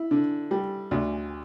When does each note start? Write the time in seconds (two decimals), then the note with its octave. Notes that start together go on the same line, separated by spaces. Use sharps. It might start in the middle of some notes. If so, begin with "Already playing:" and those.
Already playing: E4
0.11 D3
0.51 G3
0.91 D2